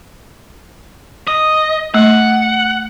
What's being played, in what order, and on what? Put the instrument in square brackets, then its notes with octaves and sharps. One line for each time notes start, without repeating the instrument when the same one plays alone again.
[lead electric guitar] D#5
[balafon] A3 [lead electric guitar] F#5